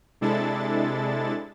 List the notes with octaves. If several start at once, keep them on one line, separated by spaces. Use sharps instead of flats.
C3 G#3 D4 E4 A4 A6